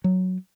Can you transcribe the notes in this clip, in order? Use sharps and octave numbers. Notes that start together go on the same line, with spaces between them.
F#3